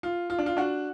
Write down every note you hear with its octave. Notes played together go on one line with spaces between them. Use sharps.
F4
F4
D4
F4
D4 F#4